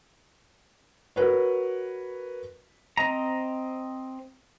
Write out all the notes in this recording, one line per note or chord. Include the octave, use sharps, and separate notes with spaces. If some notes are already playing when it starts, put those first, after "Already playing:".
F#4 A#4 B4 C#5
C4 D#5 A#5